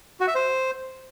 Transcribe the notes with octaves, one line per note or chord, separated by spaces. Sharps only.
F#4
E5
C5